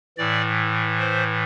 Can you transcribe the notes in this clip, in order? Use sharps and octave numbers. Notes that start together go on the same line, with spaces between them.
A2 E3 D5
C5